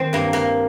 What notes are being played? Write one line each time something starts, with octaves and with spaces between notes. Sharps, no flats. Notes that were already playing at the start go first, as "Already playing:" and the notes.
Already playing: D#3 C4
G2 A#3
A#3